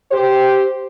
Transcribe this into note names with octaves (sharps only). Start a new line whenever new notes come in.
G4 C5